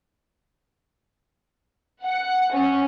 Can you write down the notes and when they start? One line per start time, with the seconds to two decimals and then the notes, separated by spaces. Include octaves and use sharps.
2.03 F#5
2.51 C#4